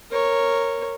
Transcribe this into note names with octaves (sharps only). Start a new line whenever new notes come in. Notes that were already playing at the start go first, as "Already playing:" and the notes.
A#4 C#5